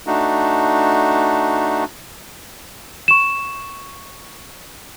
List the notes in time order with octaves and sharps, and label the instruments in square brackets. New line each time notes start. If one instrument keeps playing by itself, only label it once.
[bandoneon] A3 D4 D#4 F#4
[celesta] C#6 E7